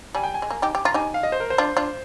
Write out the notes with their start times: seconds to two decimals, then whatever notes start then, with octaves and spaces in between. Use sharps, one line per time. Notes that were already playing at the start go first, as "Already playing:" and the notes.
0.15 G3 G#5
0.24 G5
0.34 G#5
0.42 G#3
0.50 A#3
0.62 D#4 G4
0.75 G4
0.85 F4 A#5
0.94 D#4 G4 G#5
1.14 F5
1.23 D#5
1.32 C5
1.40 A#4
1.50 C5
1.58 D4 F4
1.77 D4 F4